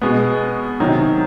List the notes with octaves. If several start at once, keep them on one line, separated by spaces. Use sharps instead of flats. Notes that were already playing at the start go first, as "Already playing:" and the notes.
B2 G#3 B3
C3 D#3 F#3